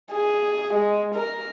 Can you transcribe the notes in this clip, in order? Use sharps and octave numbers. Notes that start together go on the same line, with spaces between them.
G#4
G#3
A#4